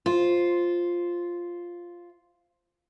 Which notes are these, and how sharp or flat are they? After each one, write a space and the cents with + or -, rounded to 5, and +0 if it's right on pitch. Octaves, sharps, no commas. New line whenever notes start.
F4 +0 C5 +0